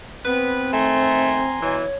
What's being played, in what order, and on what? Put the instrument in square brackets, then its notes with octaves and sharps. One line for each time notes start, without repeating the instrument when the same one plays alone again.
[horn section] B3 B4 [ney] C4
[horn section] D#3 A3 [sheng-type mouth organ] G#5 A#5 C6
[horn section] B2 E3 [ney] C#5